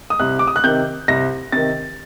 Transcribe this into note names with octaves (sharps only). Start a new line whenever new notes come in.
D#6
C2 F#6
D6
D#6
F#6
C3 D#3 G6
C2 A#6
C3 D#3 A6